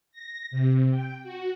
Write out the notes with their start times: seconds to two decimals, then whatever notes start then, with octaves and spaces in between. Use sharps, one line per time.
0.12 A#6
0.51 C3
0.91 G5
1.24 F#4